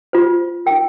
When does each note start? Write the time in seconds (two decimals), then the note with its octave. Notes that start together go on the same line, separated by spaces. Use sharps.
0.13 F4 C5
0.66 D#4 A#4 G5